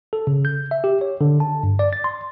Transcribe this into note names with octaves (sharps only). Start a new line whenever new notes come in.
A4
C#3
G6
E5
G4
C#5
D3
A5
G2
D5
A6
C6